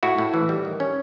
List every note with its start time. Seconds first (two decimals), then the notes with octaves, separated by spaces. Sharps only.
0.03 A2 E4 F#4
0.18 A2
0.34 E3
0.49 G3
0.65 D#3
0.80 C#4